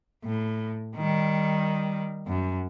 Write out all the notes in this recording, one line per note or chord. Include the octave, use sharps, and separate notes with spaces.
A2
D#3 G3
F#2